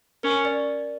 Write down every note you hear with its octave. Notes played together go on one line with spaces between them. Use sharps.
C#4 A#4
D5